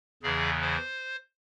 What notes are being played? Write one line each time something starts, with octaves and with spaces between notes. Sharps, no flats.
E2 C#3 E3 G#4
C5